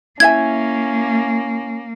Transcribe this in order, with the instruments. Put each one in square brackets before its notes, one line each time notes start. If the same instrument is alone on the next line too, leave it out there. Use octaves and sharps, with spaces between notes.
[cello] A#3 [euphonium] C#4 [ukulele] E4 E5 G#5 [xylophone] G#6